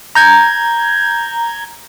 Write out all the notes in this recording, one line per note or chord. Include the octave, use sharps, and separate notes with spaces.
A#5 G6 G#6